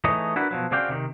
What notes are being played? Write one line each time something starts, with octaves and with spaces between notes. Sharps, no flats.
E3 A3 D#4 G#4 C#5 D#5
D4 E4 F#4 A#4 B4 F#5
B2 F3 F#3
C#3 C4 F#4 D5 F5 G5
C3 D#3